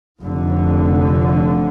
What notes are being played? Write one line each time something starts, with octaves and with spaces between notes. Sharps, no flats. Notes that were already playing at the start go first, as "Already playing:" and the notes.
F1 F2 D3